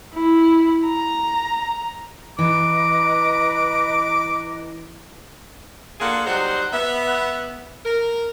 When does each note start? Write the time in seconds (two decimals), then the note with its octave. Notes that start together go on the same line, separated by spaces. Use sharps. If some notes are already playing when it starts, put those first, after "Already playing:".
0.14 E4
0.86 A#5
2.39 E3 B4 D#5 A#5 D6
6.00 A#3 D4 F4 G#4 A4 F#5
6.27 F#3 G3 D#4 C5 F#5
6.73 B3 E5
7.86 A#4